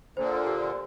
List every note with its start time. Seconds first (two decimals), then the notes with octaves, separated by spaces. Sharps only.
0.17 A#2 D3 C5
0.47 G4